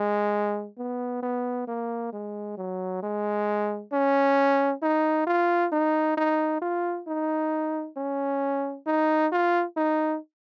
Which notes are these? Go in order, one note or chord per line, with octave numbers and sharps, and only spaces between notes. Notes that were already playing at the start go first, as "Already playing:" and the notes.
Already playing: G#3
B3
B3
A#3
G#3
F#3
G#3
C#4
D#4
F4
D#4
D#4
F4
D#4
C#4
D#4
F4
D#4